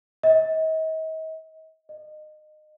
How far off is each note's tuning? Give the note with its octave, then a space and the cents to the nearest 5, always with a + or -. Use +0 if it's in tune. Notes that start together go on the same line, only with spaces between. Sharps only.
D#5 +40
D#5 -25